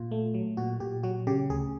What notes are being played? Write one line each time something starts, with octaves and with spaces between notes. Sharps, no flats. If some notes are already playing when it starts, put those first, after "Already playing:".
Already playing: A#2 F4
A3
F#3
A#2 F#4
A#2 G4
F#3 F#4
C#3 G4
D2 G#4